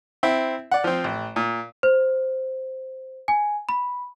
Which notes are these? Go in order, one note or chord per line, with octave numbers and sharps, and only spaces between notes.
C4 E4 E5
D5 F#5
F3 C4
A1
A#2
C5
G#5
B5